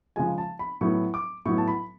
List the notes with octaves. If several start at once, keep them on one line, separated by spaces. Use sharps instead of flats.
C#3 F3 G#3 G#5
A5
B5
A2 F#3 B3 C#6
D6
A2 F#3 B3 C#6
A5
B5